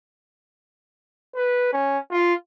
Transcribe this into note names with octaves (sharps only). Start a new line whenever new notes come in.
B4
C#4
F4